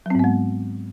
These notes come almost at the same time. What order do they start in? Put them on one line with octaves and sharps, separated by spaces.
F#3 C4 G#2 B3 G#3